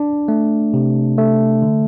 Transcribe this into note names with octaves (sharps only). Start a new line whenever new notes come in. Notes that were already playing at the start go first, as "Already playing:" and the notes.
Already playing: D4
A3
C3
A3
D3